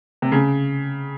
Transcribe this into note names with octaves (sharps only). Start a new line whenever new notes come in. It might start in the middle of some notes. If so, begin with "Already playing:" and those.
C3
C#3